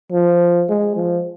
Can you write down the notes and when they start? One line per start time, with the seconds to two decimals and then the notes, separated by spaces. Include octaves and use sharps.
0.12 F3
0.69 G#3
0.96 F3